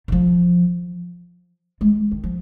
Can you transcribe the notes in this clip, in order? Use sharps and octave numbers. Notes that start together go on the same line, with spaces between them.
D#3
F3
G#3
D#3
F3